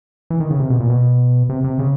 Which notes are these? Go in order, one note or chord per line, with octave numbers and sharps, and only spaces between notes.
E3
D#3
C#3
C3
B2
A#2
B2
C3
C3
C#3